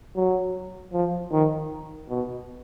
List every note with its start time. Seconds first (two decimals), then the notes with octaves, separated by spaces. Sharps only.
0.16 F#3
0.93 F3
1.32 D#3
2.09 B2